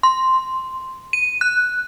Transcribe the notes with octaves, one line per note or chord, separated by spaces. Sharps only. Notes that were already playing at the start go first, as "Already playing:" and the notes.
C6
D#7
F#6